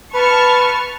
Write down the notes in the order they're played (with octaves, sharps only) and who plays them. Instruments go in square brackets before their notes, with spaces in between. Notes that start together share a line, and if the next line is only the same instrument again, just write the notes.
[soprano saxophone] B4 [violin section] A5 C#6 F6